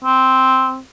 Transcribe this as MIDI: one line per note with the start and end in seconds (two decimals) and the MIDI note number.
0.05 0.81 60